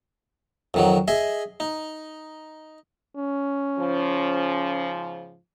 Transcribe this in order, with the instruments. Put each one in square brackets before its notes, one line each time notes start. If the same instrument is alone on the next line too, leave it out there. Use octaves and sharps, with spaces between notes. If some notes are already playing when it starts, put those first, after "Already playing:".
[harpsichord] F2 D#3 F#3
G#4 D#5 E5
D#4
[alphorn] C#4
[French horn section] G#2 C#3 F3